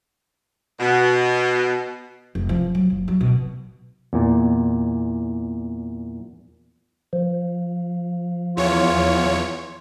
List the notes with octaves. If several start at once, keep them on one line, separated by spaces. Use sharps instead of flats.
B2
F1
F3
F#3
F#1
F#3
B2
E2 A#2
F3
E2 F4 C#5